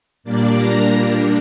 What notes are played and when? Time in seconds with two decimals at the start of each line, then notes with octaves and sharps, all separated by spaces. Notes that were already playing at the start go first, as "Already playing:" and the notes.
0.24 A#2 G3 A#3 D4 D5
0.57 A#5